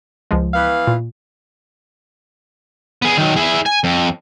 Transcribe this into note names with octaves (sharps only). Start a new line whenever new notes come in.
C#2 F3 G#3
E3 B3 F5
A#2
B3 G#4
D#3 F#3
E4 G#4
G#5
F2